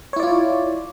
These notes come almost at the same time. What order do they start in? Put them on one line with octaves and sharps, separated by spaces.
C#5 E4 D5 F4